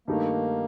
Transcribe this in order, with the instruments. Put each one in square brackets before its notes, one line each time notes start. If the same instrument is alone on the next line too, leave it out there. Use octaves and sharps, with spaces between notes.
[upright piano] G2 D#3 A3 D#4 G4 [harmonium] A#3